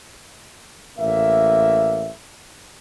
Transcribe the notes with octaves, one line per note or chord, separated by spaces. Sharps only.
A1 A#3 E5